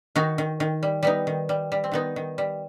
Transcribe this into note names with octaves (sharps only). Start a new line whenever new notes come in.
D#3 D#4 F#4
D#3
D#3
G3
G3 B3 D#4
D#3
G3
G3
C4
D#3 B3 D#4
D#3
G3